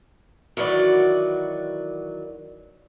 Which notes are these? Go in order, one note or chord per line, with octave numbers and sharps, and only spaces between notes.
D#3 E3 F#3 F#4 B4 D5